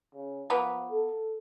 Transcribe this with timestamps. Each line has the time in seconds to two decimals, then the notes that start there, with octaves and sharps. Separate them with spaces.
0.15 C#3
0.50 F3 A#3 B3
0.90 A4